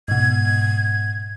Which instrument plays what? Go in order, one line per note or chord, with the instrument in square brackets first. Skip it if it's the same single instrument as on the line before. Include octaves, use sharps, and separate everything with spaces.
[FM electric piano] G#2 B2 [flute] G#6